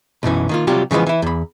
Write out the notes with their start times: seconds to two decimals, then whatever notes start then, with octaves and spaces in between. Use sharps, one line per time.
0.23 B1 F#2 E3 C#4
0.49 D#3 A#3 F4
0.67 C3 F#3 G3 F4 G4
0.91 C#3 E3 F3 G#3 B3
1.07 E3 E4
1.22 E2 B5